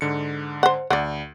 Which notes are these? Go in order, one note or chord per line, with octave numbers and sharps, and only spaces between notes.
G#2 D3 C#7
C5 F#5
D2 D5 F#5